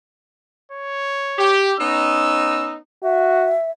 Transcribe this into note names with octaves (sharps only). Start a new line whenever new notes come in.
C#5
G4
B3 C#4 D#4 E6
F#4 E5